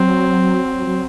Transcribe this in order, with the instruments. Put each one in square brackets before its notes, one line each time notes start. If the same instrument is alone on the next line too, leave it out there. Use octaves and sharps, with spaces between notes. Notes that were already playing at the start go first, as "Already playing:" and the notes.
Already playing: [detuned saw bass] F#3 [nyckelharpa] C4
[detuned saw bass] F#3